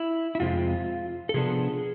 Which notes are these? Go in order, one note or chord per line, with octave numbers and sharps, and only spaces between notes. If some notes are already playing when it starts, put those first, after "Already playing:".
Already playing: E4
E4
F2 C3 G#3 C4 F4
A4
C3 F3 B3 D4 G#4